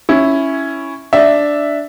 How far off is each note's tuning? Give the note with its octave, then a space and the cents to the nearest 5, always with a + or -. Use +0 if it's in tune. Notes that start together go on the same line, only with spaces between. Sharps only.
C#4 +0 E4 +0
D4 +0 E5 +0